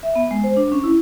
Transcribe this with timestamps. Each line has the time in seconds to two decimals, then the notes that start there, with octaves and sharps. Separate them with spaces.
0.03 E5
0.15 B3
0.31 G#3
0.44 C5
0.57 D4
0.72 C#4
0.84 E4